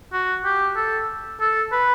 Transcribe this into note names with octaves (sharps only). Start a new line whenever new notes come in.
F#4
G4
A4
A4
B4